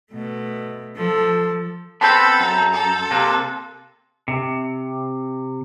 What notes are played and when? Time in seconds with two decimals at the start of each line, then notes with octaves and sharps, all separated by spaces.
0.12 B2 A3
0.97 F3 A4
2.01 B3 C4 A4 A5 B5 C6 E6 G6
2.40 F#2 A#5
2.73 A4
3.11 C3 A#3 F#6
4.28 C3